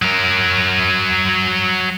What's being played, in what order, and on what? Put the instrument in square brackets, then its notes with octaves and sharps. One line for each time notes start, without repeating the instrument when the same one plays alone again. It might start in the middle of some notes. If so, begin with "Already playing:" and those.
[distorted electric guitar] F#3 A#4